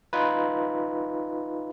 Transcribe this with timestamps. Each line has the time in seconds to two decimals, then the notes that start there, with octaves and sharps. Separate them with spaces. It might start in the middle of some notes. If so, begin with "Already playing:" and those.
0.13 D#4 F4 B4